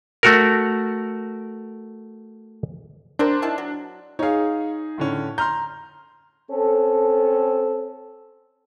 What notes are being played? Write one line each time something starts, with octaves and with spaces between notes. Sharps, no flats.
A3 F#4 A#4
C4 D4 A#4 C5
D#3 E4 A5
F#3
D#4 G#4 C#5 F5
A2 D3 C#4
A#5 C6 F6 G6
C4 C#4 A4